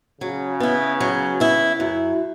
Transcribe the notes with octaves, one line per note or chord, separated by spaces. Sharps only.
C#3 F#3
B3 E4
F#3
B3 E4
F#2 E4